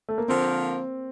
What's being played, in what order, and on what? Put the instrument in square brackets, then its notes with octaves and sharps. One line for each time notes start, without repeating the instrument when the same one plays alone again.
[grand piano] A3
A#3
[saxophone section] D3 F3 A#3 F4 A#4 [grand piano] C4